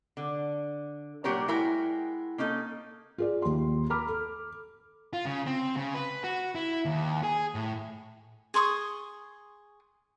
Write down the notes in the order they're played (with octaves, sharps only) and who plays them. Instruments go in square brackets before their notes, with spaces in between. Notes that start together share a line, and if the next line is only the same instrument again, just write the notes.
[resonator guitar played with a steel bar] D3
A#2 F#3 D4 G4 A#4 C#5
G#3 E4 F#4 A#4 G5 A#5
A#3 C#4 D#4 A4
[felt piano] F4 G#4 D5
D#2 C6
A#5 B5 D6 F6
A4
[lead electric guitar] F4
C#3
C4
C#3
B4
F#4
E4
D#2
G#4
A2
[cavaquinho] G#4 C6 C#6 D#6